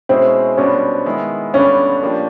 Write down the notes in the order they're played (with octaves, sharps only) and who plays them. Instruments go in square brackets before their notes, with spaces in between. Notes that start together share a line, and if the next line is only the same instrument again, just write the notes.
[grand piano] B2 G#3 C#4 E4 G#4 [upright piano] C4
[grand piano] B2 G3 B3 D4 [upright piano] C#4
[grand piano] D#3 G#3 B3 E4
[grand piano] G2 D3 G3 B3 D4 [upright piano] C#4
[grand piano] F3 A#3 D4 G4